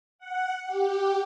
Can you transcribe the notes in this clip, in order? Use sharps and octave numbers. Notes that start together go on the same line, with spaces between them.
F#5
G4